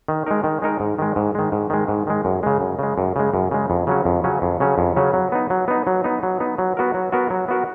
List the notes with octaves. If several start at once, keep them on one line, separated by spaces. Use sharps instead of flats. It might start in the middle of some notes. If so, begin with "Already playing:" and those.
D#3
G#3 D#4 A#4
D#3
G#3 D#4 A#4
G#2
D#3 G#3
G#2
D#3 G#3
G#2
D#3 G#3
G#2
D#3 G#3
F#2
C#3 G#3
F#2
C#3 G#3
F#2
C#3 G#3
F#2
C#3 G#3
F2
C#3 F#3 C#4
F2
C#3 F#3 C#4
F2
C#3 F#3 C#4
F2
C#3 F#3 C#4
F#3
B3 D#4
F#3
B3 D#4
F#3
B3 D#4
F#3
B3 D#4
F#3
B3 F#4 A#4
F#3
B3 F#4 A#4
F#3
B3 F#4 A#4